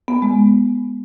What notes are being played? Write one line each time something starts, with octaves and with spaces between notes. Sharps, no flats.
B3
G#3